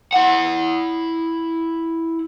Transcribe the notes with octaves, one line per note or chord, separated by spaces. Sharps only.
E4 F#5